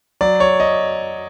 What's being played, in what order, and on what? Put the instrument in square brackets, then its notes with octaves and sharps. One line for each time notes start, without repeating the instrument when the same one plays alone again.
[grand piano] F#3 D5
C#5
D#5